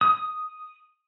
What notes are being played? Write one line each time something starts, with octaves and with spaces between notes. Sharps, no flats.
D#6